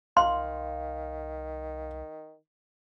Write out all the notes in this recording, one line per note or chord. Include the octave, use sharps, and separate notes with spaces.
C2 D#3 F5 C6